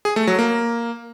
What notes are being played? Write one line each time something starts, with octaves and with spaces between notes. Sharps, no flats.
G#4
A3
F#3
A#3